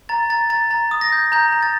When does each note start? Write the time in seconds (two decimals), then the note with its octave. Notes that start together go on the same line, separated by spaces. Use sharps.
0.09 A#5 A6
0.30 A#5 A6
0.50 A#5 A6
0.71 A#5 A6
0.91 D#6
1.01 A#6
1.12 G6
1.32 A#5 G6
1.52 A#5
1.63 A6